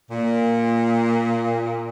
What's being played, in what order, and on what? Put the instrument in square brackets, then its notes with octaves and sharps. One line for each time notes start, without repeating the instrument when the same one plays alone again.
[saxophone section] A#2